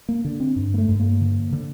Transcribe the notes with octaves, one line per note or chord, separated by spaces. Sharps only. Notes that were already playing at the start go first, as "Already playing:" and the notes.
A#3
D3
C4
G2
A#3
A3
G2
A#3
D3
D3